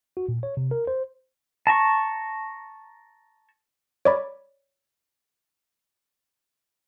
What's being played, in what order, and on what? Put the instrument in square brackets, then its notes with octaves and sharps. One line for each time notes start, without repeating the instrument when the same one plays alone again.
[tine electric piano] F#4
A#2
C#5
C3
A#4
C5
[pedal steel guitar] A5 A#5 C#6
[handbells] C#5 D5 B5